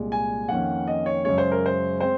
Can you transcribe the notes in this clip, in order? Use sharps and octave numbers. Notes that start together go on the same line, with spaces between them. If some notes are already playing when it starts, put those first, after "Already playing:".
Already playing: C2 A#2 G#3
G#5
F2 D#3 A#3 C#4 F#5
D#5
C#5
F#2 C#3 G#3 C#4 C#5
C5
A#4
C5
G#3 C4 C5